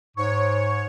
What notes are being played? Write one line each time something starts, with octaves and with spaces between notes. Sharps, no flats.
G#2 C#5 C#6